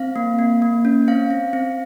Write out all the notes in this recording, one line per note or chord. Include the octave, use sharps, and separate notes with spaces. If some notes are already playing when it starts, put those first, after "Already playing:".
Already playing: C4 F5
A#3
A#3
A#3
C#4
C4 F5
C4
C4